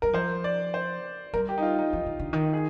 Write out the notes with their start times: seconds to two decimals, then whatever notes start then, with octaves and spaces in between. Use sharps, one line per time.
0.02 G3 A#4
0.13 F3 C5
0.44 D5
0.74 C5
1.33 G3 A#4
1.49 G4
1.58 D#4
1.63 F4
1.79 D#4
1.93 F3 D#4
2.06 D#3
2.19 D3
2.33 D#3
2.53 G#4